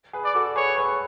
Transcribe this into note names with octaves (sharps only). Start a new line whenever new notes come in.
G#4 B4
D5
F#4 A4
G#4 B4 C#5
G#4 B4